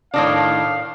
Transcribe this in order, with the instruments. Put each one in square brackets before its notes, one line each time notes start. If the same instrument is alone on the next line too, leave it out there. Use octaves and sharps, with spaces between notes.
[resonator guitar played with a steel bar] A2 D#3 D4 [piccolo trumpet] F5